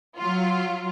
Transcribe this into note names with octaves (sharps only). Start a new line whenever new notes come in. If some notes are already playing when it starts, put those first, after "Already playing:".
F#3 F4